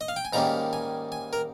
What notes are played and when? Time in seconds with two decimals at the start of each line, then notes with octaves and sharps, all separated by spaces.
0.01 D#5
0.08 F5
0.16 G5
0.25 G#5
0.33 G#2 D#3 G3 A#3 C#4 A#5
0.73 G#5
1.12 G#5
1.33 A#4